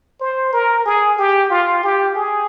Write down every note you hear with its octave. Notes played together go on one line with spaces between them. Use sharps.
C5
A#4
G#4
G4
F4
G4
G#4